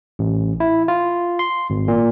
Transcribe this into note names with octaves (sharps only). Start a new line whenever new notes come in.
A1
E4
F4
C6
G#1
A#2